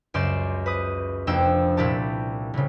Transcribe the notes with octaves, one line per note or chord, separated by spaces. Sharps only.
C#2 F#2 D5 C6 G6 E7
B4 D#6
F1 F2 A#3 D4 G5 E6
C2 A#2 E4 G4 A5
C2 C#3